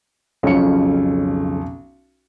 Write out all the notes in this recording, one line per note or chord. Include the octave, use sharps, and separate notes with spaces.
B1 F2 C#3 C#4 C#7